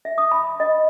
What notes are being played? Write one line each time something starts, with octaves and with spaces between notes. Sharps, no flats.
E5
D#6
B5
D#5